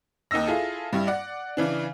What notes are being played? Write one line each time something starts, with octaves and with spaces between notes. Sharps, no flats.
D#2 D#4 D#5 E6 A#6
E4 F4 G#4 A4
G2 G3 E4
D5 F#5
C#3 E3 D4